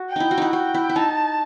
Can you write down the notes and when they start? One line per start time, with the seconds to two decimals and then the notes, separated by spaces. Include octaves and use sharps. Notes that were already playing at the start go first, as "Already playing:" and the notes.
Already playing: F#4
0.10 G5
0.16 D#4 E4
0.31 F#4
0.38 D#4 E4
0.53 F#4 G5
0.74 E4
0.89 E4
0.95 D#4 A5